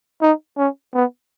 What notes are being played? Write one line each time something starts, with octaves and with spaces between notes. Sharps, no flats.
D#4
C#4
B3